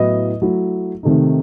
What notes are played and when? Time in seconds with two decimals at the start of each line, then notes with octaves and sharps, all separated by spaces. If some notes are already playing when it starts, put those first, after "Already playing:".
Already playing: A2 F#3 B3 E4 D#5
0.42 F#3 A3 E4
1.03 C3 D#3 A3 D#4